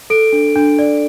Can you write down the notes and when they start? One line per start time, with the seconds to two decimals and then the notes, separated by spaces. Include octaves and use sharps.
0.10 A4 D7
0.33 D4
0.55 D4
0.79 D5